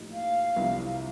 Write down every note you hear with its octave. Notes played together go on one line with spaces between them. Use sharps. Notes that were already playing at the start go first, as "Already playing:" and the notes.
Already playing: A2 F3 A#3 D#4 G4
F5
C2 C3 F3